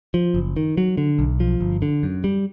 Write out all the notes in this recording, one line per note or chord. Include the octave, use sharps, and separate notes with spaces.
F3
F#1
D#3
F#3
D3
B1
F3
G1
D3
F#2
G3